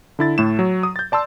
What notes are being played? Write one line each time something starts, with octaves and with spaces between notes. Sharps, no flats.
D3 E4 A6
A2 A3 E7
F#3
D#6
G6 A6
D5 A5 C6 E6